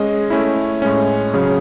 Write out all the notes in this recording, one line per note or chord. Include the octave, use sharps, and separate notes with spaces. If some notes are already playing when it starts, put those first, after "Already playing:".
Already playing: G#3 C#4 G#4 D#5
A3 C#4 E4
A2 G#3 C#4
C#3 F#3 C#4 G#4 C#5